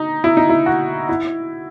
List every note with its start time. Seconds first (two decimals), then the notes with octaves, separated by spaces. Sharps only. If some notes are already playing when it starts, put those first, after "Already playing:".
Already playing: D#4
0.24 E4
0.37 D#4
0.49 E4
0.66 F#4
1.09 E4